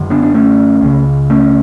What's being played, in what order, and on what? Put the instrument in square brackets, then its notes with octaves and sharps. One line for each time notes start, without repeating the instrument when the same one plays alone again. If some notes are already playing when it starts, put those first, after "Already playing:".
Already playing: [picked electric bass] F#2 D3
B3 D4
D4
A3 C#4
C#2 C#3
A3 C#4